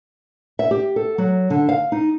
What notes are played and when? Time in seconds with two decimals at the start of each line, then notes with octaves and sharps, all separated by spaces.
0.59 E5
0.71 G4
0.96 A4
1.18 F#3
1.50 D3
1.69 F5
1.92 D#4